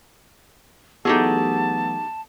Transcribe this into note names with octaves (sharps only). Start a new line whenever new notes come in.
E3 F#3 A3 B3 D#4 G4 G#4 A5